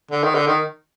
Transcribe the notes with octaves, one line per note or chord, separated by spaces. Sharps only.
D3
D#3
D3
D#3